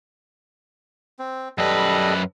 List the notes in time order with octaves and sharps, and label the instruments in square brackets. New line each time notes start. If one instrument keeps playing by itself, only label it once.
[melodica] C4
[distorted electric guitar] F#2 B4 [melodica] G3 A4 D#5